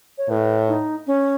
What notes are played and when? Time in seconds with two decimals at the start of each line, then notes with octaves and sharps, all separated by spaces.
0.18 C#5
0.29 A2 B4
0.68 D#4
1.07 C#4